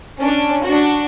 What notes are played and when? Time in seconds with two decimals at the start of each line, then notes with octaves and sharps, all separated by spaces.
0.19 C#4 D4
0.63 D4 F#4